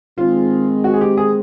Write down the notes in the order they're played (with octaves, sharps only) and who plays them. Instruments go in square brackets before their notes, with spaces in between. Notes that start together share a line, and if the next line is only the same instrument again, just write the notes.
[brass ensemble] D#3 G#3 C4 [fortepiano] F4
[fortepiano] F#4
G#4
G4
G#4